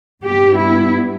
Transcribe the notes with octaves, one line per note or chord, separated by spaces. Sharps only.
G2 G3 B3 G4
E4